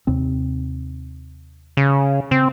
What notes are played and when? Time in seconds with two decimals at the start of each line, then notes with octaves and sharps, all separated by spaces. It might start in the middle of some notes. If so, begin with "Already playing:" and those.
0.07 D#2 C3 C4
1.77 C#3
2.31 C#3 C4